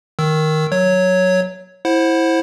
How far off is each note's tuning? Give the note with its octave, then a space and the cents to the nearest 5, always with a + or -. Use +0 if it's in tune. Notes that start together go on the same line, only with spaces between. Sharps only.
D#3 +0 E6 +0
F#3 +0 C#5 +0
E4 -5 C5 +20 F#5 -10